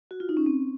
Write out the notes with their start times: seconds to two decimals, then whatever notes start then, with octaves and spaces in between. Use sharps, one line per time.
0.11 F#4
0.20 F4
0.29 D#4
0.37 C#4
0.46 C4